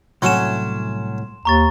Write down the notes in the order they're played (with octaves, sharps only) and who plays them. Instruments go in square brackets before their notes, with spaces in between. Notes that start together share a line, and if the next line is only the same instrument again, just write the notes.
[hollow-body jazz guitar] C2 A2 [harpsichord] F#3 C#4 [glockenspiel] C6 E7
[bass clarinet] D#2 [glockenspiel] A#5 C#6 A6